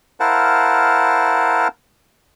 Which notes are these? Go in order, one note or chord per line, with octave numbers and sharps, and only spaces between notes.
E4 A#4 C5 F5 F#5 A5